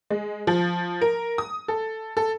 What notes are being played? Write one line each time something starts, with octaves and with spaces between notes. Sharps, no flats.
G#3
F3
A#4
D#6
A4
A4